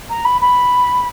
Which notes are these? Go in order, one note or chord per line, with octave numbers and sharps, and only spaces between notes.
A#5
B5
B5